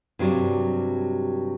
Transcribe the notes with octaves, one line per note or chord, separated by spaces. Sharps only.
G2 C3 F#3 G3 D5